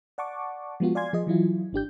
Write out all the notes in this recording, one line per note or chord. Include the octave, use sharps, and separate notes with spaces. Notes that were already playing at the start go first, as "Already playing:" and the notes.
D5 F#5 A5 C#6 D6
F3 G#3 B3 F4 F#4
D5 F5 G#5 C6 G#6
F3 G#4 D#5
E3 F#3 E4 F4
G#1 D4 G4 G6